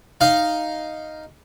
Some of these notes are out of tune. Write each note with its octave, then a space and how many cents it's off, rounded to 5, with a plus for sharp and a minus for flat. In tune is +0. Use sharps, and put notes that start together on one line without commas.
D#4 +0 F5 +0